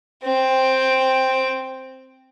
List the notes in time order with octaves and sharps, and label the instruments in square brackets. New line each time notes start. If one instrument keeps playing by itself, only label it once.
[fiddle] C4 G5